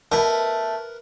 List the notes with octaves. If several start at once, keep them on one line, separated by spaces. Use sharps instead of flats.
B2 A3 A#4 B4